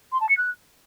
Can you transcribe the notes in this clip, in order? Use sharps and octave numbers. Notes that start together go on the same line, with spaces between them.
C6
A5
C#7
F#6